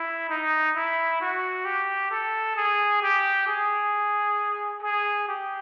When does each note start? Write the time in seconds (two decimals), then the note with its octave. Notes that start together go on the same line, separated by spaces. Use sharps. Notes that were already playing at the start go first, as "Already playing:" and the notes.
Already playing: E4
0.29 D#4
0.76 E4
1.21 F#4
1.65 G4
2.11 A4
2.57 G#4
3.02 G4
3.47 G#4
4.83 G#4
5.28 G4